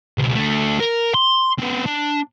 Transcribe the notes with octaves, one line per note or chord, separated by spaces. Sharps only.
C#2 B2
D3 A3
A#4
C6
B3 C4
D4